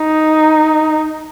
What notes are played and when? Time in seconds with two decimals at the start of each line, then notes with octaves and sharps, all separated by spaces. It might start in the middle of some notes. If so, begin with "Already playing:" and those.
Already playing: D#4